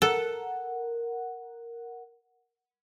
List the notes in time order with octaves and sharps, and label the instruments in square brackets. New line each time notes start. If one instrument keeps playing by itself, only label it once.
[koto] A4 [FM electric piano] A#4 F#5